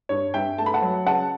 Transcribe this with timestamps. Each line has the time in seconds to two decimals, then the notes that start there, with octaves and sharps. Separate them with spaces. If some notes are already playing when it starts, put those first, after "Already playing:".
0.09 G2 C#5
0.34 G2 E5 G5
0.58 A3 A5
0.66 B5
0.74 F#5 A5
0.82 F#3
1.06 C#3 F#5 A5